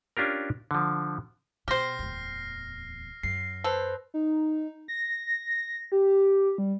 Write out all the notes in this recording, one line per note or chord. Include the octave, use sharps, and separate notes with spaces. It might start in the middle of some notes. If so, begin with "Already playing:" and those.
C#4 D4 F4 G4 A#4
D3 F3
B2 G4 C5 F6 A#6 C7
D1 E2
F#2 C7
A4 B4 C5
D#4
A#6
G4
G3